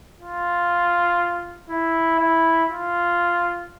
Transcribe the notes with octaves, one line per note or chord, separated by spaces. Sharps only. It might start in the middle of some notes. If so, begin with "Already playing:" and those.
F4
E4
E4
F4